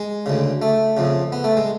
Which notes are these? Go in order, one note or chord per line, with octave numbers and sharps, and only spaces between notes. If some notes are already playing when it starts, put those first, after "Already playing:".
Already playing: G#3
D2 C#3
A3
F2 C#3
B3
A3
G#3